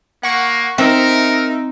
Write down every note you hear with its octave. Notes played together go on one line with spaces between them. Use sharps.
A#3 F#5 C#6
C4 D#4 A#4 E5